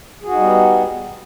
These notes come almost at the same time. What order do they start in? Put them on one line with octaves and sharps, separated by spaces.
G#4 F#4 D#4 G3 B3